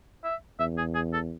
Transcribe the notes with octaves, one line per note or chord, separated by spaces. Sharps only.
E5
E2 E5
G#4
G#4
A4